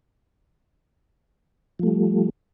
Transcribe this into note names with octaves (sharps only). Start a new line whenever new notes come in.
F3 G3 A3